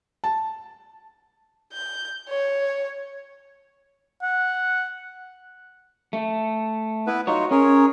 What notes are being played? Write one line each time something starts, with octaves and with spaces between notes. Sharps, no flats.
A5
G6
C#5
F#5
A3
B3 E4 B4
D#4 F4 F#4 C#5
C#4 G#4 A#4 C#5